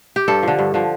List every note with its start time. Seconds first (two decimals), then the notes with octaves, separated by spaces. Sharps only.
0.16 G4
0.28 G2 A4
0.43 D3 F3
0.59 G2
0.74 D3 F3